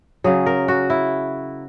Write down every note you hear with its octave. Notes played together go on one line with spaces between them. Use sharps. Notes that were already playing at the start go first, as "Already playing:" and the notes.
C#3 F#3 G#4
A#4
F#4
E4